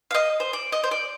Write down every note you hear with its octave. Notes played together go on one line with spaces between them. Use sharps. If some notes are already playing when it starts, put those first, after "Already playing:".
F5
D#5
C5
D5
D#5
C5
D5